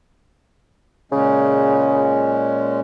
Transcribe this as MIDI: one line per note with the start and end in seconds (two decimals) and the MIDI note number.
1.12 2.80 46
1.12 2.32 49
1.12 2.80 56
1.12 2.80 61